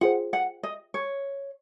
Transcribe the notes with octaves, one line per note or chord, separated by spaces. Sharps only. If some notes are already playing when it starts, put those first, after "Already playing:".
F4 G#4 C5 F#5
F#5
D#5
C#5